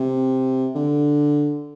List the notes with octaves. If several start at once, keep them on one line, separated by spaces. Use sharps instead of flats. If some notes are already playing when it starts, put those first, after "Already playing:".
Already playing: C3
D3